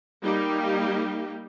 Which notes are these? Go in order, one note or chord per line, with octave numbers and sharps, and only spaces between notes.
G3 A#3 D#4 G4